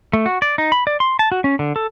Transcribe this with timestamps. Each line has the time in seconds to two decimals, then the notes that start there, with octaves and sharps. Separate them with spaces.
0.13 A3
0.26 F#4
0.42 D5
0.58 D#4
0.72 B5
0.87 D5
1.00 C6
1.19 A5
1.32 F#4
1.44 C#4
1.59 D3
1.76 A4